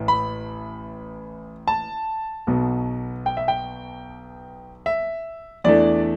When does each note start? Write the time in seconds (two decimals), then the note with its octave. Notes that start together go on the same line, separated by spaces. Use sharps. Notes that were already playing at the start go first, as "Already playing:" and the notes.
Already playing: A1 A2
0.08 B5
1.68 A5
2.47 B1 B2 B3
3.26 G5
3.37 E5
3.48 G5
4.86 E5
5.64 E2 E3 A3 D4 D5